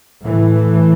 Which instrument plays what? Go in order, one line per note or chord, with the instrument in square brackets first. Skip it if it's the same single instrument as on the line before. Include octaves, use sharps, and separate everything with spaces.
[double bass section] A2 E3